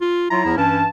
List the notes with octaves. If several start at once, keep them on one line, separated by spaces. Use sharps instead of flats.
F4
F#3 E4 F4 A#5
E2 F3 E4
G2 E3 C#4 A5